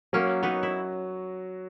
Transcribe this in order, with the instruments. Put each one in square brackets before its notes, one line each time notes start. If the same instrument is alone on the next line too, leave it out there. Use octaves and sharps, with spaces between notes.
[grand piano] F#3 [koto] A#3 C#4
[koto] B3 D#4 [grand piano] F#4
[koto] E4